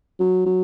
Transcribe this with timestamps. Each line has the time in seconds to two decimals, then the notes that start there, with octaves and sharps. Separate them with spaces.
0.19 F#3
0.46 F#3